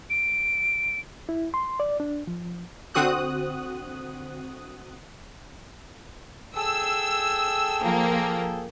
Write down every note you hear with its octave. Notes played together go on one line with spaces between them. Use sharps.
D7
E4
C6
D5
D4
F3
D3 C4 F#4 D#6 F#6
G#4 A4 G5 E6
F3 A#3